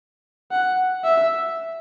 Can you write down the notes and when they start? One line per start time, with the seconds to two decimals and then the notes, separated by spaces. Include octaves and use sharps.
0.51 F#5
1.04 E5